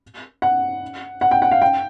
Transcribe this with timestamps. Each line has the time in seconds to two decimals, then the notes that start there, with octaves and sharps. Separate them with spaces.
0.42 F#5
1.21 F#5
1.31 G5
1.42 F#5
1.51 F5
1.62 G5